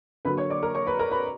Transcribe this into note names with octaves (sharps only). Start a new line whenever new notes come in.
D3 F#3 A#3 B4 B5
C#5 C#6
D5 D6
A#4 A#5
C#5 C#6
B4 B5
A#4 A#5
B4 B5